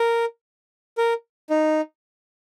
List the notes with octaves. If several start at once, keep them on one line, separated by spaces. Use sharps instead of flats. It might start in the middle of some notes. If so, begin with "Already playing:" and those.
Already playing: A#4
A#4
D#4